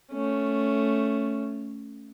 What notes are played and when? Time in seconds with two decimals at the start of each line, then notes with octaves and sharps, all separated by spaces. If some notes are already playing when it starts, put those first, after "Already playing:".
0.12 A3 C#4